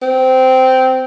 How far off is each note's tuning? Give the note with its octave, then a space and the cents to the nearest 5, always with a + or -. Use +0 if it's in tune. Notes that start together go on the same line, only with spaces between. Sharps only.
C4 -15